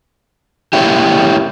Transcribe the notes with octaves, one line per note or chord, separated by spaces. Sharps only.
A#3 C#4 E4 G4